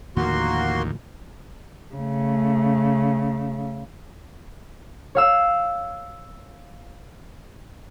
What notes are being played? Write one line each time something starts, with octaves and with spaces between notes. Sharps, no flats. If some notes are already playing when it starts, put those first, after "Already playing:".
D#2 A2 D3 F3 A#3 F#4 C6
C#3 A3
C#5 F5 E6